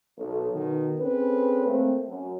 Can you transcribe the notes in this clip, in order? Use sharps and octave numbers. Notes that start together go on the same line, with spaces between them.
B1 A4
B2 D#3
C4 C#4 G#4 A4 B4
A3 A#3 C4
F#2